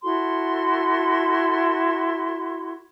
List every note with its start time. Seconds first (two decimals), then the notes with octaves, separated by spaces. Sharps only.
0.02 E4 F#4 A4 C6